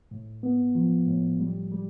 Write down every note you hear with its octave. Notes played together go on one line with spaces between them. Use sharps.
A2
B3
F3
A2
G3
G3